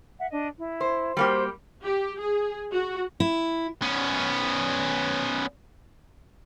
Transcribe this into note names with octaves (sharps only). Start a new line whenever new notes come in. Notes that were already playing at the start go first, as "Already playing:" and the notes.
E5 F#5
D4 D#5
E4
C5
G3 A#3 F#4 G4 C5
G4
G#4
F#4
E4
B3 C#4